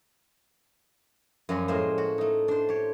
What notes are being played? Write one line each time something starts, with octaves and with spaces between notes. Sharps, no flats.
F#2 F3 G3 F#4 G#5 C6
A2 G#3 A#3 C5
F#4
A3 D#4
D4 C5
G4 C#5